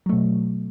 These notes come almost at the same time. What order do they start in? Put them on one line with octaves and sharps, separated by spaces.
F#3 A3 B2